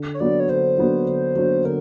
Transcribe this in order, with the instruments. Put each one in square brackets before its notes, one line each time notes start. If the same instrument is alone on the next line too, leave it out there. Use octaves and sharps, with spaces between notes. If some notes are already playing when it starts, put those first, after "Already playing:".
Already playing: [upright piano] D3
[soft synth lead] C#5
[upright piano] F#3 B3 D4 F#4 [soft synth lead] D5
[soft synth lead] C#5
[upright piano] D3 [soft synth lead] C5
[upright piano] F#3 B3 D4 F#4
D3
F#3 B3 D4 F#4
[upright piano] D3 [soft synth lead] A#4